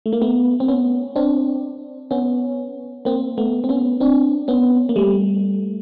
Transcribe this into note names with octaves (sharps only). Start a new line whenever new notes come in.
A3
A#3
A3 B3
C4
B3 C#4
C4 D4
B3 C#4
A#3 C4
A3 B3
C4
B3 C#4
C4 D4
B3 C#4
A#3
G3 A3